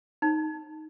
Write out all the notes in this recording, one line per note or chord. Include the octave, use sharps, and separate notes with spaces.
D#4